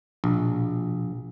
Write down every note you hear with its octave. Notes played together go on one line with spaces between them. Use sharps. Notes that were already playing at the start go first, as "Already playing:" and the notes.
A#1 B2